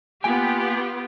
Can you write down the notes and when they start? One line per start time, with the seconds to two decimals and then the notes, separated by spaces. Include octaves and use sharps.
0.24 A#3 B3 F4 G4 G5 G#5